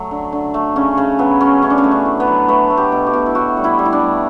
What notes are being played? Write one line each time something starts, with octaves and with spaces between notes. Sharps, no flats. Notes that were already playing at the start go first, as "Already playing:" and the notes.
Already playing: F#3 A3
D3
D3
A3
C#3 C#4
C#3 C#4
F#3 B3
C#3 C#4
A3 C#4
D4
C#4
A3
D4
A2
B3
F#3
A3 B3
A3
G4
B2
G4
B2
E4
A2 F#4
G3
E4
G3
E4
D4
G3